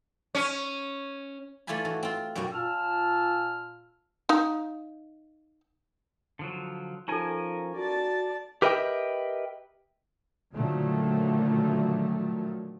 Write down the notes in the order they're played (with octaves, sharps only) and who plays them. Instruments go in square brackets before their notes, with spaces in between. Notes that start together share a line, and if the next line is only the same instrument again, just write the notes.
[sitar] C#4
[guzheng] E3 A3 F4 D5 G#5 B5
E3 F#4
C4 F4
F#2 B2 G3 F#4 F#5
[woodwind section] A#2 F4 A5 E6 F6
[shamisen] D#4 F5
[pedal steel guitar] D3 F3 F#3
[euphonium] F3 [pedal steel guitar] C#4 A#4 G#5 [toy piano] D#4 A4
[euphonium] F#4 [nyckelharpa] D5 A5
[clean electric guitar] G4 A#4 B4 D#5 E5 G5
[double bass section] A#2 D3 D#3 F3 F#3 A3